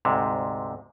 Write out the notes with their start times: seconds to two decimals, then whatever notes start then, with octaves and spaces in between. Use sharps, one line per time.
0.05 D2 G#2 C3